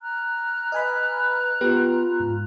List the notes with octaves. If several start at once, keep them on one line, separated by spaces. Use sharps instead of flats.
A#5 F6 F#6
B4 D#5 G#5 B5
B3 F4 G4 B4
G#2